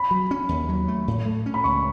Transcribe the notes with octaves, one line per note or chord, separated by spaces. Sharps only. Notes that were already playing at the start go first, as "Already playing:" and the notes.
Already playing: B5
F#3
C#4
D#2
F#3
A3
A2
A3
C#4
B5
C#2 C#6